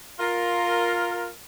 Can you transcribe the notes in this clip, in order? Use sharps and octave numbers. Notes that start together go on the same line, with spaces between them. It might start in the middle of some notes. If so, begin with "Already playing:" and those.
F4 A#4